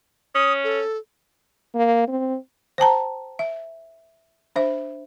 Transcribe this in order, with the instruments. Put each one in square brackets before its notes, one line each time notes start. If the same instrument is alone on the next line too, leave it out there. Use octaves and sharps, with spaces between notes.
[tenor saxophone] C#4 [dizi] D#6
[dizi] A4
[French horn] A#3
C4
[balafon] C5 G5 A5 A#5
E5
D4 C5 E5